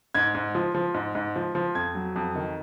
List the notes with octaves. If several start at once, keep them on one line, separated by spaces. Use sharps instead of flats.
G#2 G#6
G#2
F3
F3
G#2
G#2
F3
F3
F2 G#6
F#3
F2
D#3